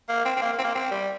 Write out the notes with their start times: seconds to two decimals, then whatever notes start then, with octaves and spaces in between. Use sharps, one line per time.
0.09 A#3
0.25 C4
0.37 C4
0.42 A#3
0.52 A#3
0.58 C4
0.64 A#3
0.75 C4
0.91 G3